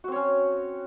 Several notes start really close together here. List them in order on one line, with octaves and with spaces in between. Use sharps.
F#4 C4 C#5 C#4